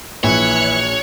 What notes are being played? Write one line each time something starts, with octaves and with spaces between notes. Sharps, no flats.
A#1 E3 C#5 F#6 C#7